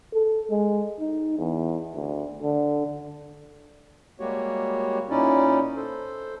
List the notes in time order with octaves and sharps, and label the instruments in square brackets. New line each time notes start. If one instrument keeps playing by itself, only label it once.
[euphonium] A4
G#3
D#4
E2
D2
D3
[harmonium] G3 G#3 A#3 F#4 G4 C#5
A#2 C#4 D#4 E4 D5
A4 C5